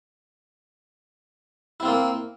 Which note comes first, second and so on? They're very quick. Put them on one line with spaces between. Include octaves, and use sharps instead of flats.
E4 C4 F4 A#3